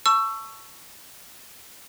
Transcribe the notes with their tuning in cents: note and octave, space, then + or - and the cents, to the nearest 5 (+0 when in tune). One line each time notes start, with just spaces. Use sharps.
A5 +0 C#6 +5 E6 +20